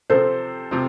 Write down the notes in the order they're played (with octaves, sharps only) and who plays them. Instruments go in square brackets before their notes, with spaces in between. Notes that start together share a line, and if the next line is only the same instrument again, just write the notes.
[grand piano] C3 F3 C4 [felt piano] A4 C5
[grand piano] C3 F3 C4